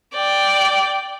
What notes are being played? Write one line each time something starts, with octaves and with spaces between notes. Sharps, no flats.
D5 G5